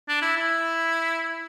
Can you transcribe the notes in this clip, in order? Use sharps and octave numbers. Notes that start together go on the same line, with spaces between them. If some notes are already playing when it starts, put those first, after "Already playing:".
D4
E4
E4